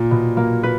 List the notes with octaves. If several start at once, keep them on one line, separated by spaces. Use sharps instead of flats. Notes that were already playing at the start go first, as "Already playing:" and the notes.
Already playing: A#2
B2
A#3
B4